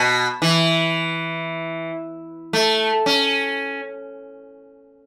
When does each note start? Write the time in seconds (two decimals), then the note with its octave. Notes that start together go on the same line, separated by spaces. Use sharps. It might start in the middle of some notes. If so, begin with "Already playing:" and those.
Already playing: B2
0.42 E3
2.53 A3
3.06 C#4